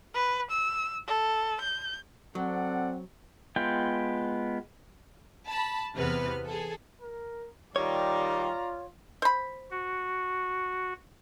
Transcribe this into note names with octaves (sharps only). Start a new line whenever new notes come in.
B4
E6
A4
G6
F#3 C4 A4 D5 F#5
G#3 B3 F4 G5
A5 B5
E2 C3 B3 B4 F6
G#4 A4
A#4
D#3 G3 F4 C#5 D5 A#5
C5 B5
F#4